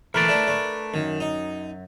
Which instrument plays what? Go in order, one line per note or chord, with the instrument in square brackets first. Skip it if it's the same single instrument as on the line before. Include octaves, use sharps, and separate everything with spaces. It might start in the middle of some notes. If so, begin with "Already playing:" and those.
[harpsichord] E3 A3 [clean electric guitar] A#4 B4 D5
[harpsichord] A3 D4 E4
A3 D4
[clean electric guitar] F#2 [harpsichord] D#3
[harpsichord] D#4